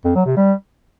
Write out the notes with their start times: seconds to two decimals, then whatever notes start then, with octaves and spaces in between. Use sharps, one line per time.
0.04 F2
0.15 F#3
0.26 C3
0.36 G3